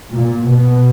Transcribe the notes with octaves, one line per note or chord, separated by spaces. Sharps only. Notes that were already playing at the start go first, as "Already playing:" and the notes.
A#2
B2